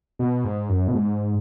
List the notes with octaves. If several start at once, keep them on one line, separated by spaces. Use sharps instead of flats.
B2
G#2
F#2
B2
G#2